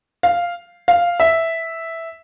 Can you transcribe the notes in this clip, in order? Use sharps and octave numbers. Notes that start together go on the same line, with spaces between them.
F5
F5
E5